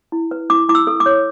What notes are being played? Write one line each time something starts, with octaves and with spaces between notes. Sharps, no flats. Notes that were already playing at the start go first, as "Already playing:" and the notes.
E4
B4
E4 D6
E4 D6
E6
A4
D6
C#5